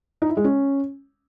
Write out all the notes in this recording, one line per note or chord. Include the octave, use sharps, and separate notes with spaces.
D#4
E4
G#3
C#4